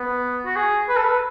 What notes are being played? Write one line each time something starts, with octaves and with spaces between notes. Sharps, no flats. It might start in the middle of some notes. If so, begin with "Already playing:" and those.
Already playing: B3
F#4
G#4
B4
A4
B4